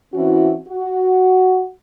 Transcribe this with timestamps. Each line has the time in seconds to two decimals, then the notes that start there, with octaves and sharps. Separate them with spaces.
0.13 E3 C4 C#4 E4 F#4
0.68 F#4